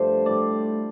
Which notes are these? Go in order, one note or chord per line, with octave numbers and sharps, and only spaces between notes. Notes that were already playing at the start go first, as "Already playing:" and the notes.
Already playing: G2 F3 A3 C5
A2 G3 D5